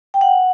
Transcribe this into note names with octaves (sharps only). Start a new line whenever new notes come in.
G5
F#5